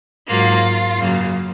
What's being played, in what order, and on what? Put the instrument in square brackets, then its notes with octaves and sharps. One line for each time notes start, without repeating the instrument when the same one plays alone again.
[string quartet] G#2 F#3 A#3 F4
F#2 C#3 F#3 A#3